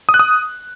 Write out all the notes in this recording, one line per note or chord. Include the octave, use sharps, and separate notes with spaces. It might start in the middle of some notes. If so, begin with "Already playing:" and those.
D#6
F#6
D#6